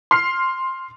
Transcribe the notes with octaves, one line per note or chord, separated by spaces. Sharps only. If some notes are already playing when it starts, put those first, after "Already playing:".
C6 F6 C7